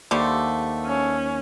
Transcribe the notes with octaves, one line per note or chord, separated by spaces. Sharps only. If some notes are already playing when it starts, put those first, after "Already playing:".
D#2 D3 G3 A3 C5 D6
C#4